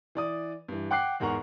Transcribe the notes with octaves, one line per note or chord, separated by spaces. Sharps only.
E3 D5 D#6
G2 E3
F#5 G5 D6 F#6 C7
E2 G#2 A#4 F#5 A#5 C#6